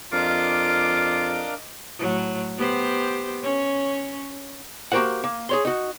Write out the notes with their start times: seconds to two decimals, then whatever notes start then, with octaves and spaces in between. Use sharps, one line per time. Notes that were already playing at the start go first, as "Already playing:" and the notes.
0.13 F2 D4 F4 A#4 D#5 F5 D6
1.99 A2 F#3
2.57 B3 G4 C5
3.43 C#4 C#5
4.92 A#3 F#4 G4 A#4 C5 F#5
5.24 A#3
5.49 G#4 C#5 C6
5.65 D#4 F#4